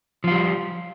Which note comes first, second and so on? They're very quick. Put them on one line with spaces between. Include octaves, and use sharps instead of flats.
F3 F4 G3